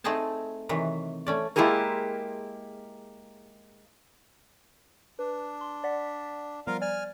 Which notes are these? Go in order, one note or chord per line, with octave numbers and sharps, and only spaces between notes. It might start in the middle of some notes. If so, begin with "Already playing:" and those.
A3 C4 D#4 G#4 G5 A5
C3 D#3 E3 F#3
A3 C#4 D5
G#3 A#3 E4 G4 G#4 A#4
D4 B4
C6
D5 F#5 B6
F3 G3 B3 F4 A#4 F5
D5 G#5 F6